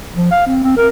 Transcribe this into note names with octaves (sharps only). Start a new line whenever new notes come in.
F3
F5
C4
C4
A#4